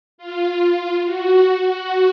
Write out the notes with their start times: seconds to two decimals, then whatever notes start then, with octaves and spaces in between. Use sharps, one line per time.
0.18 F4
1.04 F#4
1.62 F#4